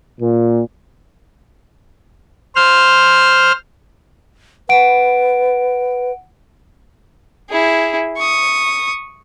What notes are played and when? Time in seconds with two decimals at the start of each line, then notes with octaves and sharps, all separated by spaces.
0.20 A#2
2.55 C5 F6
4.69 B4 F#5 D7
7.50 E4 G#4
8.17 C#6 D#6